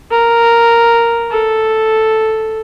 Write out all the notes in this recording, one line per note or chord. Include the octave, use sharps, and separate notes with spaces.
A#4
A4